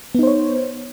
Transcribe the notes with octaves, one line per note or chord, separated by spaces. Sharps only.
B3 D#4 C5 C#5